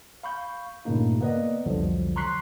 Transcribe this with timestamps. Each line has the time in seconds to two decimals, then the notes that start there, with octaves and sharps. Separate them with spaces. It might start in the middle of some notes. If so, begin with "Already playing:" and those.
0.23 F5 B5 C#6 G6
0.85 G2 A#2 C#3 A3 A#3 D#4
1.21 A#3 B3 B4 D5 D#5
1.66 C2 F2 D3 F3 F#3
2.16 A#5 C6 C#6 F#6 B6 C7